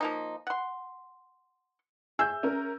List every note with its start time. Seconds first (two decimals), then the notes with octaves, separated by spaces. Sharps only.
0.01 F3 A#3 D#4
0.47 F#5 C6
2.19 G#4 E5 E6 G6
2.43 C#4 A#4